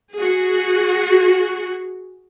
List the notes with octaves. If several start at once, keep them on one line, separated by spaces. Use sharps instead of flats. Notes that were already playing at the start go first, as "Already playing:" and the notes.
F#4 G#4